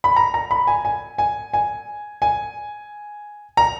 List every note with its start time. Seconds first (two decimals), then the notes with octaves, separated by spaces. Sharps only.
0.04 B5
0.16 A#5
0.34 A#5
0.51 B5
0.67 G#5
0.85 G#5
1.18 G#5
1.54 G#5
2.22 G#5
3.57 A#5